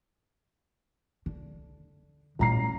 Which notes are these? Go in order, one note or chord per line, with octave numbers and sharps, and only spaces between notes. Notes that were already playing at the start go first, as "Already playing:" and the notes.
D3
A1 A#2 G3 A#5 C7